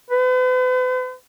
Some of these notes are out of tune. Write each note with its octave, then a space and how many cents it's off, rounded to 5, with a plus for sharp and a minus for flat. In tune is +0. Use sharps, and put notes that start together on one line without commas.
B4 +45